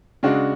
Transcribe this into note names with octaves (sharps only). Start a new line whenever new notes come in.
C#3 G#3 D4 F#4